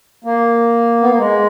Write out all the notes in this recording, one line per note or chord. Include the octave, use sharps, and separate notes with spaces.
A#3
B3
A#3
G#3